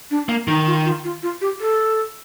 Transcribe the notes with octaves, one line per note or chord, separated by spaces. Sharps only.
D4
A#3
D#3 D#4
F4
F4
F4
F4
G4
A4